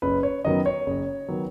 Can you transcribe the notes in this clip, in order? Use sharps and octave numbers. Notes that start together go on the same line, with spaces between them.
F#1 B4
C#5
F#2 D#3 F#3 B3 D#5
C#5
F#1
D#3 F#3 B3